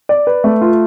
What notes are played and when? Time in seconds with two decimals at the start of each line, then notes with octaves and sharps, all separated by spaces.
0.09 D5
0.27 B4
0.44 A3
0.61 F4